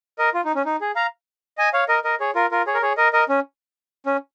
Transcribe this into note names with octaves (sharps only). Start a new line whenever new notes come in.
A#4 D#5
F4
D#4
C#4
D#4
G#4
F5 A#5
D#5 G#5
C#5 F5
A#4 D#5
A#4 D#5
G#4 C#5
F4 A#4
F4 A#4
G#4 C#5
A#4
G#4 C#5
A#4 D#5
A#4 D#5
C#4
C#4